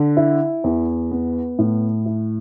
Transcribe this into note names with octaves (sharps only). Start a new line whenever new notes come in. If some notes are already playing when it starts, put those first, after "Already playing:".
Already playing: D3
E4
E2
B3
A2
E4